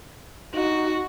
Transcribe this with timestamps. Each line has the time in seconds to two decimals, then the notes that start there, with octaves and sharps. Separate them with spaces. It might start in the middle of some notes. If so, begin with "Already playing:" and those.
0.55 D#4 F#4